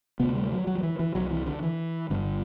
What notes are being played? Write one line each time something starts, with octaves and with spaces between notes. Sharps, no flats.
D2 C3 B3
G3
F#3
F#3
F#3
E3
E3
C2 C3 F#3
E3
D3
E3
G1 G2 D3